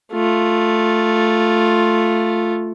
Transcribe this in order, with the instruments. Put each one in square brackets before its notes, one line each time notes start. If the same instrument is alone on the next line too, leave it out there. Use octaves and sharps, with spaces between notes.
[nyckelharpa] A3 F4